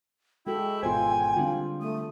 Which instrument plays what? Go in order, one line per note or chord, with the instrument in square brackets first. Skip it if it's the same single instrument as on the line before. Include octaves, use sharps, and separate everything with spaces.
[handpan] G#3 F#4 A4 [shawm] E4 [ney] G5
[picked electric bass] G#1 B2 E3 [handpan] F4 C5 [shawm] G#5
[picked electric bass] D3 G3 D4 [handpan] C4 F4
[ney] A3 [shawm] D#6